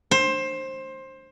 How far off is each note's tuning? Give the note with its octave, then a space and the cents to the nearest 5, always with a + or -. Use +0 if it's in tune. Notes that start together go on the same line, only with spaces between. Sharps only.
C5 +20